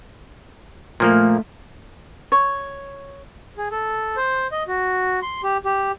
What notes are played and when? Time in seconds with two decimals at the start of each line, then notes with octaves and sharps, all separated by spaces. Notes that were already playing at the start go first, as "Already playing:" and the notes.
1.00 A#2 F3 A3 A#3
2.32 C#5
3.57 G#4
3.72 A4
4.16 C5
4.52 D#5
4.68 F#4
5.22 C6
5.43 G4
5.65 G4